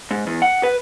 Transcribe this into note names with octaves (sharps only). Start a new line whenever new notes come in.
G#2
E2
F#5
B4